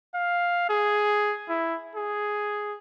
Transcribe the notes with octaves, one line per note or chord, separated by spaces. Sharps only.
F5
G#4
E4
G#4